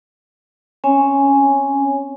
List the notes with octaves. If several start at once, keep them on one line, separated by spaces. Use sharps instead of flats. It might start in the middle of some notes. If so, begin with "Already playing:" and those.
C4 C#4 C#5 G#5